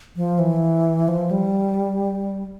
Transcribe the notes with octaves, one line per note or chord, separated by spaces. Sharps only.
F3
E3
F3
G3